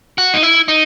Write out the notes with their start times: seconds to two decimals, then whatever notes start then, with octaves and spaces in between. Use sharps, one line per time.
0.18 F#4
0.34 D#4
0.43 E4
0.68 D#4